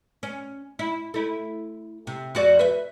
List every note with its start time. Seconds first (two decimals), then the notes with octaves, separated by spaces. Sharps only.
0.23 C#4
0.79 E4
1.14 A3 E4
2.07 C3
2.35 F2 F#4 D5
2.59 B4 E5